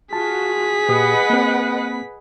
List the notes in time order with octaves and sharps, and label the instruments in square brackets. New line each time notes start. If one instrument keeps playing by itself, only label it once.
[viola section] F4 F#4 [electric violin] G#4 B6 [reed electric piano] A5
[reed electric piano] A#2 G4 D#6 [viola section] B4 D#5 F#5
[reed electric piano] A#3 C4